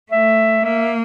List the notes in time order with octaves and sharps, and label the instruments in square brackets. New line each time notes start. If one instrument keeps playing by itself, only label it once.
[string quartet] A3 [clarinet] E5
[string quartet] A#3 [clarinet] E5